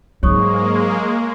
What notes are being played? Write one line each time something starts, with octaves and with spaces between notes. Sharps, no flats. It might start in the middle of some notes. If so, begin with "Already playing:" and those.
G#2 F#3 G#3 A#3 C#5 C#6 D#6